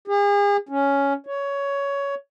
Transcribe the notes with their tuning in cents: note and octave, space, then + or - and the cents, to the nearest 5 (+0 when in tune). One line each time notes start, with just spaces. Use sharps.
G#4 -40
C#4 +5
C#5 +15